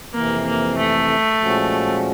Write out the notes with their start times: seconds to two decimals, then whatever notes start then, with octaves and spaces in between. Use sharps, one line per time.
0.14 F2 C3 E3 A#3
0.47 A#3
0.78 A3
1.41 A#2 F3 G#3 C#4 F#4